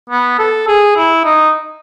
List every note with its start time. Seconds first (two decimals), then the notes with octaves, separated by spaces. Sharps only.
0.10 B3
0.39 A4
0.68 G#4
0.97 E4
1.24 D#4